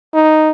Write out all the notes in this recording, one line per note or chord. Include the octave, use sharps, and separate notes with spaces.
D#4